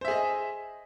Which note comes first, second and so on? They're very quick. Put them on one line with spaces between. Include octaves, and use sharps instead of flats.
C5 E5 G#4 D#5